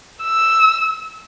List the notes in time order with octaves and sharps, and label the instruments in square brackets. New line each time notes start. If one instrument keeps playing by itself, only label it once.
[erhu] E6